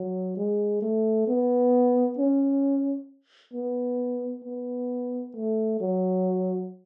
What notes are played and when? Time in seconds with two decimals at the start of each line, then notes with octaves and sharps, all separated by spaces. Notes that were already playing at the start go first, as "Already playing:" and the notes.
Already playing: F#3
0.37 G#3
0.82 A3
1.28 B3
2.18 C#4
3.54 B3
4.45 B3
5.36 A3
5.81 F#3